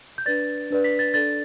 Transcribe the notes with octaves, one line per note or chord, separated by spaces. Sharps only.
G6
D4 B4 D5 A6
D4 B4 D5
B6
A6
D4 A4 D5 A6